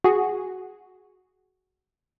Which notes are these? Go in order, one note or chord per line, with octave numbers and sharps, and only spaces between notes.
F#4 G#4